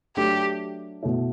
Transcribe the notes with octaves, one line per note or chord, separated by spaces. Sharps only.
F#3 A3 D4 G4
B2 A3 E4